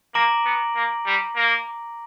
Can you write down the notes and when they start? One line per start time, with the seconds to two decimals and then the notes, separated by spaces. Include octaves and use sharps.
0.14 A#3 A#5 D6 A#6 D7 F#7
0.45 B3
0.75 A#3
1.06 G3
1.36 A#3